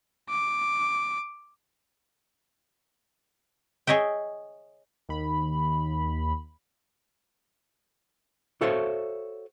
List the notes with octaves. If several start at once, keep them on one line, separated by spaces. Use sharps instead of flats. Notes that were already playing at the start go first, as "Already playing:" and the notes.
D6
G#4 C#5 D#5 E5 G5
D#2 B5
F#4 A4 C5 C#5 E5 F5